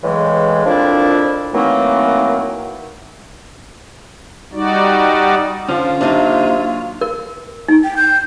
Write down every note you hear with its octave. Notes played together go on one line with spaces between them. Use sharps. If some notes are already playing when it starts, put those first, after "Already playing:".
E2 A2 C#3 E3 F#3 G#3
C2 F2 F3 D4 E4 D5
D#3 E3 F#3 A3 A#3 C4
G3 D#4 F#4 D5
D3 F3 C#4 F4
C3 F#3 A#3 D4 D#4
A#4
D#4
G5
G6